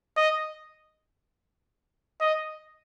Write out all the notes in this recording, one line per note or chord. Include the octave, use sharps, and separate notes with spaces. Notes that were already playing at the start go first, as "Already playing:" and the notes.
D#5
D#5